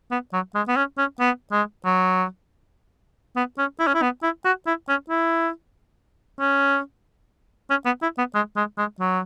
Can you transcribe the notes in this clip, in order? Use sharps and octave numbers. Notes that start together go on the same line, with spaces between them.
B3
F#3
G#3
B3
C#4
C#4
B3
G#3
F#3
B3
C#4
E4
C#4
E4
B3
E4
F#4
E4
C#4
E4
C#4
C#4
B3
E4
B3
G#3
G#3
G#3
F#3